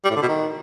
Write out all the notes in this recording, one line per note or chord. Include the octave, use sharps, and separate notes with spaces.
G3
A2
D3
B2
D#3